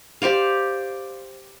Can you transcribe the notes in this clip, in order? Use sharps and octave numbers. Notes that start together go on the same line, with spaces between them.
G4 C5 D5 F5